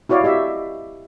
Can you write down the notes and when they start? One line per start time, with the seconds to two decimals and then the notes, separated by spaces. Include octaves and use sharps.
0.09 E4 F#4 C#5 D5 F5
0.24 G4 D#5 E5